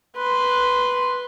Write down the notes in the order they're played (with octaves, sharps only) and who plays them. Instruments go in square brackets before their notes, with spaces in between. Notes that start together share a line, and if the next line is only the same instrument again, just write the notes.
[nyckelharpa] B4 C6